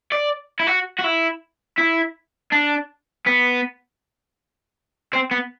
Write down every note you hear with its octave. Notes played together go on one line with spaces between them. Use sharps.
D5
E4
F#4
F#4
E4
E4
D4
B3
C4
B3